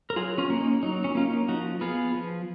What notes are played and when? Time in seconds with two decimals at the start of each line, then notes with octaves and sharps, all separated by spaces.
0.10 A#4
0.16 F#3 F4 G#4
0.38 C#4 F4
0.50 A#3 C#4
0.60 D#4
0.83 F#3 D#4
1.04 C#4
1.15 A#3 C#4 F4
1.27 D#4
1.48 F3 D#4 F#4
1.81 B3 F4 G#4
2.14 F3